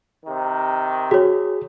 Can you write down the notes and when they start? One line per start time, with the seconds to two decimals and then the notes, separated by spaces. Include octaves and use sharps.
0.25 C3 D#3
1.11 F#4 G#4 C#5